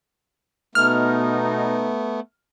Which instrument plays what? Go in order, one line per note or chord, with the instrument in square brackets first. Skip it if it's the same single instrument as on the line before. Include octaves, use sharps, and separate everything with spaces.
[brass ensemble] B2 D#4 [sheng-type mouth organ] A3 B3 [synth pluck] F6